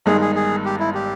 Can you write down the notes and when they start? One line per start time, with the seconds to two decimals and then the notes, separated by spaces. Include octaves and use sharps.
0.06 G1 G2 D#3 G#3 D#4 G#4
0.21 G#4
0.35 G#4
0.65 G4
0.80 E4
0.94 G4